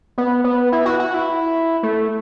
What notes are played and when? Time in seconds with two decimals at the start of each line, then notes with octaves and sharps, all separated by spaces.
0.18 B3
0.44 B3
0.72 E4
0.86 F#4
0.99 F#4
1.14 E4
1.83 A3